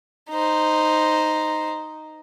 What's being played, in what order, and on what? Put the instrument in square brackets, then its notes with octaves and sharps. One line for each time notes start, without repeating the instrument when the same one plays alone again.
[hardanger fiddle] D#4 C5